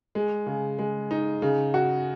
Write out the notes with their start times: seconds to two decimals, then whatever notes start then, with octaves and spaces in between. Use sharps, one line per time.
0.15 G#3
0.46 C#3
0.79 G#3
1.11 D#4
1.42 C#3
1.74 F#4